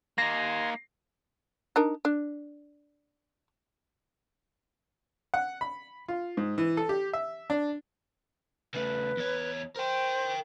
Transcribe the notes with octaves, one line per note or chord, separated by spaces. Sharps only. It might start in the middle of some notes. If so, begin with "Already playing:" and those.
A#3 D#4 G#5 A#5 C6 A#6
D4 D#4 A#4
D4
F#5
B5
F4
G#2
E3
A4
G4
E5
D4
C#3 A3 B4
E2 C#5
A#4 C5 G5